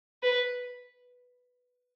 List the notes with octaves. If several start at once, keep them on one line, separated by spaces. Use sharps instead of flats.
B4